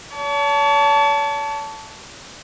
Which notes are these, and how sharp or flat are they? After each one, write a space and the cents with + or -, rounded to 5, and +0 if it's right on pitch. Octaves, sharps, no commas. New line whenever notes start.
C#5 +40 A5 +0